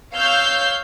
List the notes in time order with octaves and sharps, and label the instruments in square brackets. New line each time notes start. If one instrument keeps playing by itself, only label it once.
[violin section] C#5 F5 E6 F6 G6